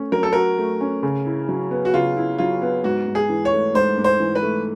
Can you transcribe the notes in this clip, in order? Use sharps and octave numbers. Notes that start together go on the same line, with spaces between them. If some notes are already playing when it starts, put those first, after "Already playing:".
Already playing: A3 C#4
F#3 A#4
A4
F#4 A#4
A3
C#4
C#3
E4
F#3
B3
F#4
C#3 F4
E4
F#3 F4
B3
G#2 F#4
G#2
G#4
E3
C#5
A3
G#2 C5
G#2
C5
E3
B4
A3